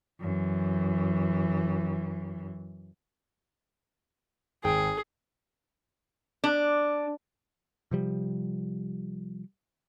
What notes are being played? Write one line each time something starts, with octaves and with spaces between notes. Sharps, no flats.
F#2 E3
G#1 G#4 G5
D4
C3 F3 G3